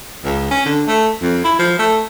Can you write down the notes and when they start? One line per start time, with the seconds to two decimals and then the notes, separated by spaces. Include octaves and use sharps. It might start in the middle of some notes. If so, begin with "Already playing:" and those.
0.24 C#2
0.51 C#4
0.66 D3
0.87 A3
1.21 F2
1.44 E4
1.59 F3
1.79 A3